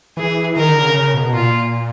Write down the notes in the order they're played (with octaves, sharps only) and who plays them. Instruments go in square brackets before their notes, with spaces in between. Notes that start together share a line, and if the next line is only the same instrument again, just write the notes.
[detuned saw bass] E3 [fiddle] G#4
[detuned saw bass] D#3 [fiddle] A#4
[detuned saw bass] D3
C#3
C#3
B2
[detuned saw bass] A#2 [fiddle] F4